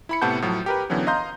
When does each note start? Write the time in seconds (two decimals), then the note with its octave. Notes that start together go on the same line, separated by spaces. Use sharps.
0.09 E4 B5 C#7
0.22 A2 C3 B3 F#5 A5 G6
0.42 A2 F3 F#3
0.66 G4 A#4 B4
0.90 D3 E3 F#3 B3 C#4
1.07 D#5 F5 A#5 C6 G6